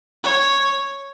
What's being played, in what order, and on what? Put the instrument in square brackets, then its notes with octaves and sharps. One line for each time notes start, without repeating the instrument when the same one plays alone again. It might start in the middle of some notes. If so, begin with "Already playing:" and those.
[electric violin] C#5